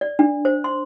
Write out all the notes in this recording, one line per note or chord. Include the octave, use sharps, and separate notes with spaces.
D5
D4
C5
C6